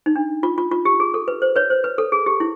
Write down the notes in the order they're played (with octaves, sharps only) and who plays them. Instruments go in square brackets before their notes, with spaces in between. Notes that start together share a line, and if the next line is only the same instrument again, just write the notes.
[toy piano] D#4
D4
F4
F4
F4
G4
G#4
A4
B4
C5
B4 C#5
C5
B4
A4
G#4
G4
E4